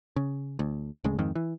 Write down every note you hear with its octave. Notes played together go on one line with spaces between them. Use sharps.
C#3
D2
D1 A2 C#3 G#3
F2 G#2 D#3
E3